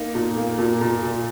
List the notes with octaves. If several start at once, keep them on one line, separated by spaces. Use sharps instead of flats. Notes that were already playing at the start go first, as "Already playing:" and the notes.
Already playing: A#3 D#4
A#2
A#3
A#2
A#2
A#2